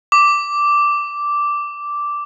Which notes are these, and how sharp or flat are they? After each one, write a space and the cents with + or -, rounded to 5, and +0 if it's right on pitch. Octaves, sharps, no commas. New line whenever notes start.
D6 -5